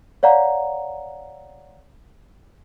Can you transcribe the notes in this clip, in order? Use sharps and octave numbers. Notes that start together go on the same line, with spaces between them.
C#5 D5 F5 F#5 A#5